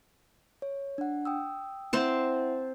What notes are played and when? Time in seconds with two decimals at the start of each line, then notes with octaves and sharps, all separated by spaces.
0.62 C#5
0.98 D4 F#5
1.25 G5 D#6 E6
1.93 C4 E4 C5 E5 F#5 A5